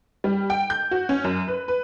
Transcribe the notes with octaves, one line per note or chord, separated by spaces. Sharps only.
G3
G5
G6
F#4
C#4
F#2
B4
B4